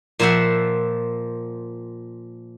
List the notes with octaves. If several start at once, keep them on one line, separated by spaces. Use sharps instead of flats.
A#2 F3 C5 E5 F#5